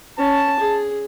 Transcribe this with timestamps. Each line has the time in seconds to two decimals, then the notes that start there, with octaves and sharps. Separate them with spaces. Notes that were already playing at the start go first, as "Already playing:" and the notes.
0.18 C#4 A5
0.60 G#4